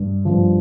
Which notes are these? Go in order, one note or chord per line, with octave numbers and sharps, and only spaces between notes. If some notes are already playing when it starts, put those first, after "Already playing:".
Already playing: G2
G2 F3